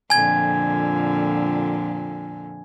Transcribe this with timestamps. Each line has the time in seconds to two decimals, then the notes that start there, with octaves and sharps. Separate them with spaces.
0.10 F2 A#2 D3 G#5 G#6